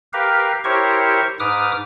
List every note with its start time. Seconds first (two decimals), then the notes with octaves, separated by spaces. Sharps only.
0.13 G4 A#4 B4 F5
0.64 E4 G4 A#4 C5 C#5 C#6
1.40 G#2 B4 D6 D#6 F6